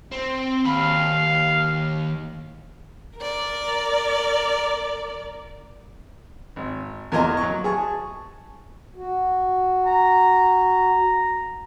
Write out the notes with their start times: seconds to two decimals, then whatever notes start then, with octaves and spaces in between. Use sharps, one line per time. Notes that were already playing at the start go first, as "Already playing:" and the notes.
0.12 C4
0.65 D#2 F5 B5
3.17 A#4 D5
6.56 G#1
7.12 E2 A#3 F4 D#5 A#5
7.37 F#3 C#6
7.64 G#4 G#5 A5 C#6
8.96 F#4
9.86 A#5